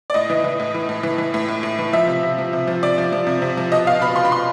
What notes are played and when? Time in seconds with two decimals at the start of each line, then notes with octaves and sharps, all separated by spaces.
0.10 D5
0.14 A2 D#5
0.30 E3
0.44 E3
0.60 A2
0.74 E3
0.89 A2
1.03 E3
1.18 E3
1.34 A2
1.48 A2
1.63 A2
1.79 E3
1.93 F3 E5
2.07 C3
2.23 C3
2.38 F3
2.53 C3
2.68 F3
2.83 C3 D5
2.98 F3
3.12 F3
3.27 C3
3.42 C3
3.57 F3
3.72 B2 D#5
3.87 B2 F5
4.01 B2 B5
4.16 B2 C6
4.25 B5
4.31 B2 C6